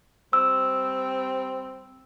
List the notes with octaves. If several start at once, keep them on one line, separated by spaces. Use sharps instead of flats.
G3 C4 E6